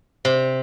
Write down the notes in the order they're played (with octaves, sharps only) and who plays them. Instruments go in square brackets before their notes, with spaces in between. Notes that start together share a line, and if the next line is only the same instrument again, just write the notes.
[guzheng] C3